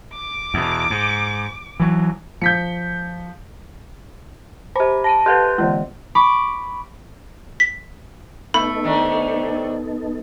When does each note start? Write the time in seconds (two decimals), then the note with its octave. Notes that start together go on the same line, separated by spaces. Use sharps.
0.13 D6
0.54 E2 B2
0.90 G#2
1.80 E3 F#3
2.42 F3 G6 B6 C#7
4.76 G4 C5 A#5 B5 D6
5.04 A5 A#6 D7 D#7
5.26 G4 A4 B4 C6 F#6 G6
5.58 D3 E3 G#3
6.15 B5 C#6 D6
7.60 B6
8.54 A3 B3 D#4 A4 B5
8.83 C3 D#3 D4